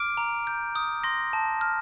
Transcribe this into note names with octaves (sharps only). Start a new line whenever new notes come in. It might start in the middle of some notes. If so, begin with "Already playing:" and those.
Already playing: D6 F6 D7
A#5
G6
D#6
C6 A#6
A5
F6